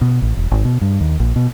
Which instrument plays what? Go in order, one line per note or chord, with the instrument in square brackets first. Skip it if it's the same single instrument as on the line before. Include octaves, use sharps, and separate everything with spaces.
[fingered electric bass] B2
A1
E1
G#1
B2
G2
D#2
A#1
B2